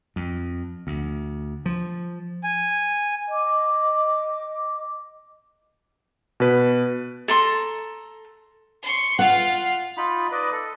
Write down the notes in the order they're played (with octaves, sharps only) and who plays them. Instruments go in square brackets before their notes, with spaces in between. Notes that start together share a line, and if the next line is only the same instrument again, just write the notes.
[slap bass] F2
D2
F3
[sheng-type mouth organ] G#5
[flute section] D#5 D6
[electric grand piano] B2 B4
[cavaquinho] A4 A#5 C6
[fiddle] C6 C#6
[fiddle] F4 F5 [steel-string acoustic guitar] F#5
[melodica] D#4 F4 B5
B4 D5 D#5
A4